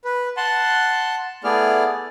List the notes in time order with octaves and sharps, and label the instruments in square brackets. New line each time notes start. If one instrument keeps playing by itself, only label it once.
[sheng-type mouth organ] B4
F#5 A5 C6 F#6
A3 B3 E4 G#4 D5 F6